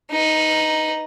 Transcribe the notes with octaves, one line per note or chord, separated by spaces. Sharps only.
D#4 B4